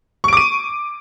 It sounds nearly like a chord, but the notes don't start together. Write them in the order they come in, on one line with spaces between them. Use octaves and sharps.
C#6 D7 D6 D#7